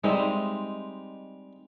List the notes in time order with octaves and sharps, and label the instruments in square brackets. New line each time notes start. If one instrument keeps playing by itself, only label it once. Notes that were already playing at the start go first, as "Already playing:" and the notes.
[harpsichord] G3 D#4 [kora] G#3 C4 E5